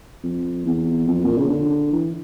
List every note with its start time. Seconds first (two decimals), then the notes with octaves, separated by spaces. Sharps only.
0.23 F2
0.65 E2
1.07 F2
1.25 A#2
1.38 C#3
1.49 D3
1.92 E3